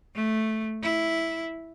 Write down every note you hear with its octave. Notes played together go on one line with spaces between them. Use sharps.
A3
E4